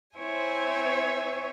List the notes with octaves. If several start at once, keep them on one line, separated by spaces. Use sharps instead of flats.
C4 E4 C5 C#5 E5 G#5